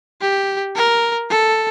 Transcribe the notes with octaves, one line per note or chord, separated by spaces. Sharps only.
G4
A#4
A4